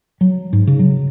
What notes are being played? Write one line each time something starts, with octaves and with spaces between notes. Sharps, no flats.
F#3
G#2
C#3
F#3